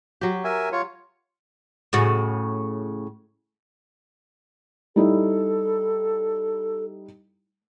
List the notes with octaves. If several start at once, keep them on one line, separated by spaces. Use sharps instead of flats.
F#3 G4
A#4 E5 G#5
F4 C#5
A2 C#3 F#4
G3 D#4 E4 A4